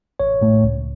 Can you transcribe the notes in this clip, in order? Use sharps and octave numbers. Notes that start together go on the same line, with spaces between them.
A1 C#5
A2 A3
C#2